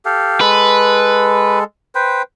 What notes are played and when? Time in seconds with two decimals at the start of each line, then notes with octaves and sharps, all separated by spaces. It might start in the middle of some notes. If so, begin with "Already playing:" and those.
0.05 G4 A4 F5
0.41 G#3 A4 B4
1.95 B4 C5 G5